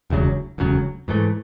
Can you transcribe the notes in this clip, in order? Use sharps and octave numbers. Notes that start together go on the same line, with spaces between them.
E1 D2 C#3 F#3
E1 D2 C#3 F#3
G#2 E3 A3